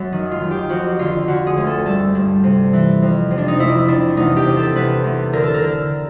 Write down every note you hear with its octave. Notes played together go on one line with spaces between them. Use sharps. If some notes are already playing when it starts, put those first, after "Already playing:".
Already playing: F#2
D#3
F4
D#3
G4
F2 F#4
D3 F4
D3 F#4
G#4
D2
A4
G2 A4
G2
C3
E3
F2
C3
D4
D#4
F2 E4
C3 D4
E2 D#4
G4
C3
A4
E2 B4
E2
D3 A#4
A4
A#4
D3